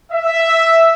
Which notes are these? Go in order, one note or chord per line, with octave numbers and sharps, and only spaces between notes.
E5